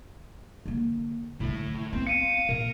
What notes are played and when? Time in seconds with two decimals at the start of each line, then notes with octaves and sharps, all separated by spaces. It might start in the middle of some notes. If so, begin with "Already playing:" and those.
0.66 D3 A#3
1.40 A2 D3 F#3 E4
1.93 B3 C4
2.07 F5 C#7 D#7
2.49 A#2 A#4